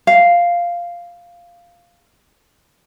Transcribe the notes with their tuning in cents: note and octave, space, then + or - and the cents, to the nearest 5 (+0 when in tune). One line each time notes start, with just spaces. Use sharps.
F5 -5